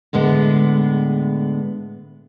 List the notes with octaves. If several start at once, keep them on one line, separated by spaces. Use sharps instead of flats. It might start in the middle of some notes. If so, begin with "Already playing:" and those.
A2 D3 G#3 B3